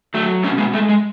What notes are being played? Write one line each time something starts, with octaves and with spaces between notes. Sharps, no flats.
F#3 A3
B2 A3 C#4
G#3 B3
G#3 A3
G#3